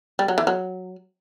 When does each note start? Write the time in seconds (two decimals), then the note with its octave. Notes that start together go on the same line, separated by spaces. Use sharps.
0.19 G3
0.28 F#3
0.38 E3
0.47 F#3